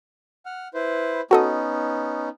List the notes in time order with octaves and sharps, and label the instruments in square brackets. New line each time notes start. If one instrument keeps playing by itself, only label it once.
[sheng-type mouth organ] F#5 F6
E4 B4 C5
[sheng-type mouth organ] B3 C#4 D#4 [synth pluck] F#4 A4 D#5